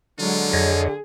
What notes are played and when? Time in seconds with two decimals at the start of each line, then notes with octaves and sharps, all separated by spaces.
0.19 D3 F#3 G#3 F4
0.53 F2 G#4 C#5 D#5